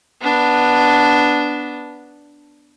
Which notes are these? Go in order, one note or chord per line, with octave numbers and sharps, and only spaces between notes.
B3 D4